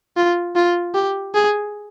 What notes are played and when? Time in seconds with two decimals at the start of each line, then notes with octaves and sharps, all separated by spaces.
0.17 F4
0.56 F4
0.94 G4
1.35 G#4